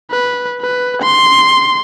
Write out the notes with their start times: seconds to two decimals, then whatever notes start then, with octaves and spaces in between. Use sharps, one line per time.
0.11 B4
0.62 B4
1.02 C6